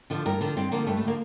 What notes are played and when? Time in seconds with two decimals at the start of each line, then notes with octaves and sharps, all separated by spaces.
0.10 D3 F3
0.25 G2 A#4
0.41 D3 F3
0.57 G2 C4
0.72 D3 F3 A#3
0.87 G2 A3
0.97 A3
1.03 D3 F3 A#3